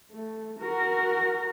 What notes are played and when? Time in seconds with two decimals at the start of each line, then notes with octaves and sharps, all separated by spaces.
0.12 A3
0.59 F#4 A#4